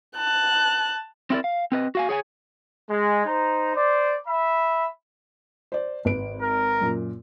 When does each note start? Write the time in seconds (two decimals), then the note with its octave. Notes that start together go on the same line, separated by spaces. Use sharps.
0.17 A5 F#6
1.30 C4 D#4 E4 F#4 A#4 D5
1.44 F5
1.72 C4 B4 D#5
1.95 F#4 F5 G#5
2.09 G#4 C#5 G5 G#5
2.90 G#3
3.26 D#4 C5 A#5
3.75 C5 D5
4.27 E5 B5
5.72 C5 D5
6.05 G#1 B4 D7
6.41 A#4
6.81 F#2 A#2